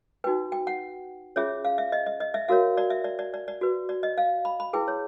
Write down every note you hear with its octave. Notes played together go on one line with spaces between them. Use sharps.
D#4 F#4 B4 G5
G5
F#5
C#4 F4 G#4 C#5 E5
F5
E5
D#5
D#5
D#5
E5
F#4 A#4 C#5 F5
D5
E5
D5
D5
D5
D5
F#4 B4
D5
D#5
F5
B5
B5
E4 G#4 B4 G5
C#5